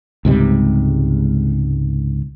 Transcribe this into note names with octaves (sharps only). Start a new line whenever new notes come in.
C#2 G#2 C3 G3